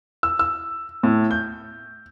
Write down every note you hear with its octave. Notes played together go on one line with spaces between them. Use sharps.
E6
E6
A2
G6